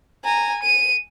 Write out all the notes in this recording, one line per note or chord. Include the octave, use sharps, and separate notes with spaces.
G#5 A#5
D#7